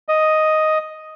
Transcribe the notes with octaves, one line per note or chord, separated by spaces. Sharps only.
D#5